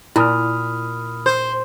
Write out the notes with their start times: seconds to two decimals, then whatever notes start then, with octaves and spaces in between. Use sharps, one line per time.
0.16 A#2 E4 B5 D#6 F6
1.26 C5